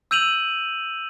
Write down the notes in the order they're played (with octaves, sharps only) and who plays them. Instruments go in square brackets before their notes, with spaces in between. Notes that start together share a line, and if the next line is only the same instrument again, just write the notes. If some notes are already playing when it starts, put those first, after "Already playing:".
[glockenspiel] E6 G6 D#7 F7 F#7